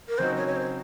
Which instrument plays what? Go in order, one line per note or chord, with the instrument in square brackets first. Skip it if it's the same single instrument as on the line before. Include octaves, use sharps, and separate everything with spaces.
[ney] A#4
[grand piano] C#3 F#3 C4 D#4 F#4 [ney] C5
[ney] C#5
C#5
C5